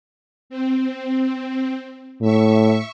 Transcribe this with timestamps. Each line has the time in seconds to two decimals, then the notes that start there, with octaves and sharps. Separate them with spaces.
0.50 C4
2.22 A2 E5 C#6